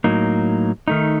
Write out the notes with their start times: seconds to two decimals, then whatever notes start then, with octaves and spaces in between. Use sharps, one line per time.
0.04 A2 F#3 A#3 D#4
0.88 D#3 A3 D#4